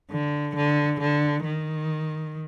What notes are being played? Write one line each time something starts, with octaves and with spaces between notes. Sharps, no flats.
D3
D3
D3
D#3